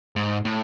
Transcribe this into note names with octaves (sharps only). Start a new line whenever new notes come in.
G#2
A2